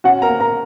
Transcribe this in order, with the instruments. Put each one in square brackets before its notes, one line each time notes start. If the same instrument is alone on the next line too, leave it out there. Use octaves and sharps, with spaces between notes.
[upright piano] C#4 F#4 F#5
A#4 A#5
A#3
A#4 A#5